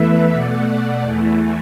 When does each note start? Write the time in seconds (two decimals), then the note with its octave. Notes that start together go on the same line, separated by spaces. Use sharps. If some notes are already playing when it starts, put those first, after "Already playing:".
Already playing: E2 E3 A3 B4 E5
0.33 B2 A3 D5 F#5
0.67 D5 F#5
1.02 E2 E3 A3